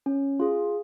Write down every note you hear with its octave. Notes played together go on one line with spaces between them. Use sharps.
C#4
F4 G#4